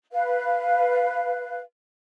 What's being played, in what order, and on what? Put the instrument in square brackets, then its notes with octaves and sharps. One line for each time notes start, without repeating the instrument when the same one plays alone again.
[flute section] B4 F5